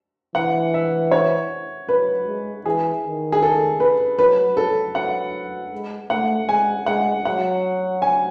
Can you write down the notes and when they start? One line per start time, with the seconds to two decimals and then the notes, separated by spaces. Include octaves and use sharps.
0.35 E3 F#5
0.74 E5
1.11 C#5
1.89 F#3 B4
2.27 G#3
2.65 E3 G#4
3.04 D#3
3.32 G#4
3.43 A4
3.80 B4
4.19 F#3 B4
4.57 F#3 A4
4.95 F#3 F#5
5.72 G#3
6.10 A3 F#5
6.48 G#3 G#5
6.86 G#3 F#5
7.25 F#3 F#5
8.02 G#5